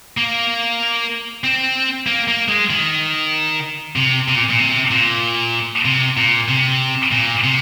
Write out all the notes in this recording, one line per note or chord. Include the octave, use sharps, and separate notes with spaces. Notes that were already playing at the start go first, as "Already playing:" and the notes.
A#3
C4
A#3
A#3
G#3
D#3
C3
C3
A#2
A#2
C3
A#2
C3
A#2
C3
A#2
C3